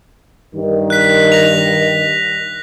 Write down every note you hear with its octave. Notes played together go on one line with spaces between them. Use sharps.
G2 D#3
F#6 B6
A#6 F7